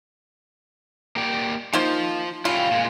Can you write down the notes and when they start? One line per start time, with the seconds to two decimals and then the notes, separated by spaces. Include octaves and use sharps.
1.16 A#3 G4 D5
1.73 D#3 F3 A#3 C5
2.45 G3 C#4 E4 F4
2.71 A#2 G#3